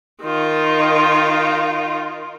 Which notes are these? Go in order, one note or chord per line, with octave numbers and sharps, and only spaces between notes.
D#3 F4